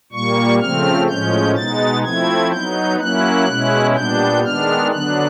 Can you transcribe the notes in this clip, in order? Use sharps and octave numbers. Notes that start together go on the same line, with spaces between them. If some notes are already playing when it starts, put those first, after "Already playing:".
A#2 G3 A#3 C#6
C#3 F3 A3 C4 F6
A2 F3 G#3 C#4 G6
B2 G#3 B3 D#4 A6
F3 A3 C4 E4 G#6
F#3 B3 D#4 G6
F#3 A#3 C#4 E4 F#6
B2 G#3 C#4 E4
A#2 G3 B3 D4 G6
D#3 G#3 B3 D4 F6
D3 F#3 B3 D4 F#6